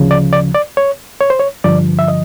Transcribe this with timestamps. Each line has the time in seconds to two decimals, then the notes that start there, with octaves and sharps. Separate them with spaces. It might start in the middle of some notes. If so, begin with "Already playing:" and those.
Already playing: D2 C#3 F3
0.11 D5
0.33 D5
0.54 D5
0.77 C#5
1.21 C#5
1.30 C5
1.40 C#5
1.64 G2 D3 F3 D5
1.99 E5
2.08 D#5